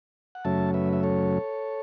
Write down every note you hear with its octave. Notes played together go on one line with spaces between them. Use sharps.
F#5
F#2 C#3 F#3 A3 C#4 E5 A5
B4 E5
E5
A4 C#5